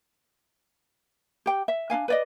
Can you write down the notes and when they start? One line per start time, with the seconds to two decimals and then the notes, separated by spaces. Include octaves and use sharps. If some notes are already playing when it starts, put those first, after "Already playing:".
1.46 G4 G5
1.68 E5
1.90 D4 D#4 F5 G#5
2.08 B4 D5 D#5